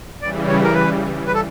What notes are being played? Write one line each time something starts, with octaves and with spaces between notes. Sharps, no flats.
C#3 E3 G3 D5
C#5
A#4
B4
B4
A4